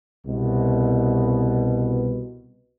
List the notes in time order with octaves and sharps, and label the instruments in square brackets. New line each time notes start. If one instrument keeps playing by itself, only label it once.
[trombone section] C2 B2